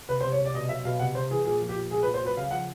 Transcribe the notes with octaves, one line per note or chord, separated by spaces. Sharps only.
C3 B4
C5
C3
C#5
C3
D5
B2 D#5
F#3 E5
B2 F5
C3 F#5
C3 C5
E3 G#4
A#2 G#4
F3
G4
A#2
A#2 G#4
B4
A#2
C5
F#3 B4
C#3 F5
F3 F#5